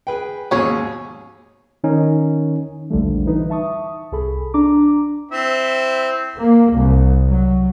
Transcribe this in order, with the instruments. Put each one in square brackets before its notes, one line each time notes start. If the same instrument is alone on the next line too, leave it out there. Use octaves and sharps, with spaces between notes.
[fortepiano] G#4 B4 G5
[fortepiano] D#2 G#2 B2 [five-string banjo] C#4 G#4 C#5
[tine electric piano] D#3 C#4 D#4
[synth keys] A#1 D#2 D3 F3 G3 A3
E3 D#4 B4
E5 A5 C#6 D#6
C2 G#4 A4 B5
D4 A#5 D6
[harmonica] C4 E4
[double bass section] A#3
C2
F#3